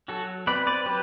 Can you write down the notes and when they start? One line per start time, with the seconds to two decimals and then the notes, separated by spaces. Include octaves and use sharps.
0.08 F#3 F#4 A4
0.47 C4 B4 D5
0.67 B4 D5
0.86 F#3 G4 B4